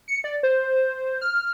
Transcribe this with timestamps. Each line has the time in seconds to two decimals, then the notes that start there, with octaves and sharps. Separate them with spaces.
0.08 C#7
0.24 D5
0.43 C5
1.21 F6